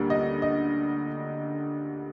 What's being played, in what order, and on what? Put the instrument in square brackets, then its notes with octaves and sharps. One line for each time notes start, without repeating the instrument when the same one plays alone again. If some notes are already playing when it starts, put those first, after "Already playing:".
Already playing: [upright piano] D2 D3 G3 A#3
D#5
D#5